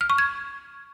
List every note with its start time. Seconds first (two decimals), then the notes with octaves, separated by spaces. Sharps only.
0.01 F6
0.10 C#6
0.18 G#6